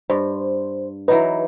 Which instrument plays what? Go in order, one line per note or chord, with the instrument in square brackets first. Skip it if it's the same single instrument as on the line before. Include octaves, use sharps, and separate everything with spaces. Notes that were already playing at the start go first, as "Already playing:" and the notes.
[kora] G2 [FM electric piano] C5
[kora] E3 F#3 D#4 [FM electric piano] B4